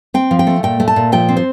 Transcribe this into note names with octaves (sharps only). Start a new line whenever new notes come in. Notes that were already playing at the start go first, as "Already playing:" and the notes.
C4 G5
F3
G5
A3
A#2 G5
A3
A5
A#2
F3 G5
C4
C5